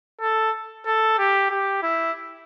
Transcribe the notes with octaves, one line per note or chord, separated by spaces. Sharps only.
A4
A4
G4
G4
E4